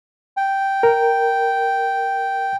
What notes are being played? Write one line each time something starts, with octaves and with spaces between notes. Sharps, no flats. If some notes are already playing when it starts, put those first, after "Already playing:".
G5
A#4